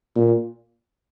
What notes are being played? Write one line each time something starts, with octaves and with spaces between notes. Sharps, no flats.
A#2